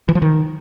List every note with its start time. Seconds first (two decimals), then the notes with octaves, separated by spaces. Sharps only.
0.09 E3
0.15 F3
0.22 D#3